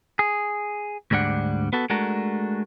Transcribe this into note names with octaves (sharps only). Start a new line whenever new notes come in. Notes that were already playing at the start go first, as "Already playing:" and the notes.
G#4
D2 G#2 G3 D4 F#5
B3 F#4 A4
G#3 A3 D4 F#4 A#4